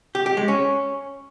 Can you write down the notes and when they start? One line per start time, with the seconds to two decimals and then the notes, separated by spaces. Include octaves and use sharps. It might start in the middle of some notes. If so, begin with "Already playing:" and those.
0.15 G4
0.26 G4
0.37 G#3
0.48 C#4